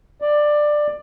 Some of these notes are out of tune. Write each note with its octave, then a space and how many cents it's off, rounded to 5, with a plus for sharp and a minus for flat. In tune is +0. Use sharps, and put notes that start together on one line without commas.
D5 +15